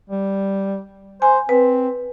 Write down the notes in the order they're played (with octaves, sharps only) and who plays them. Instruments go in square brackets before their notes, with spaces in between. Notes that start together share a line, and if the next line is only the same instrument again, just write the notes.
[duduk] G3
[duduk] C5 [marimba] G#5
[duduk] C4 [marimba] B4